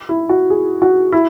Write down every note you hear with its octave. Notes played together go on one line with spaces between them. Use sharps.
E4
F#4
G#4
F#4
E4